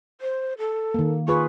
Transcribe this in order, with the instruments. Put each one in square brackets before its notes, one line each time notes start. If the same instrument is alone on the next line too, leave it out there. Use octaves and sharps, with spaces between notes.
[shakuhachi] C5
A4
[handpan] D#3 A#3
[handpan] F4 G#4 B4 [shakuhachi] C#6